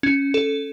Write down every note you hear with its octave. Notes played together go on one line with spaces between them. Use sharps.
C#4
A4